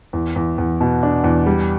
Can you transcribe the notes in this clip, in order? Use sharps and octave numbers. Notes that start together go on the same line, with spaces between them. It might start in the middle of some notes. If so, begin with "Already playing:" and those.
E2
E2
E2
B2
D4
E2
G3